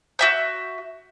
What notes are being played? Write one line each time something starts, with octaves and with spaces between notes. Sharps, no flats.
F#4 E5 G6